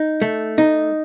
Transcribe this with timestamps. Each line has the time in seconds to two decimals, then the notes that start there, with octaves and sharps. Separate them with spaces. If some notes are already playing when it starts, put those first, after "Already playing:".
Already playing: D#4
0.22 A3
0.58 D#4